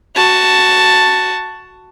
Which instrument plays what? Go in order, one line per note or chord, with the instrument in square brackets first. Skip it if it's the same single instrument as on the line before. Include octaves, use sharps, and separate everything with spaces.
[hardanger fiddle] F#4 A5